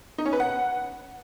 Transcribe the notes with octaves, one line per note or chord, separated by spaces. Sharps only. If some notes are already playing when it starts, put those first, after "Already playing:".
D#4
C#4
B4
F#5